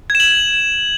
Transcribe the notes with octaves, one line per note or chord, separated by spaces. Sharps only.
G#6
E7
F#7